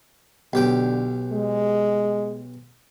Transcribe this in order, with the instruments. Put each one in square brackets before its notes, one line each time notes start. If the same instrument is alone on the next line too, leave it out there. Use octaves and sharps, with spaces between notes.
[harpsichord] B1 G4 G5 [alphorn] D3
[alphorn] G#3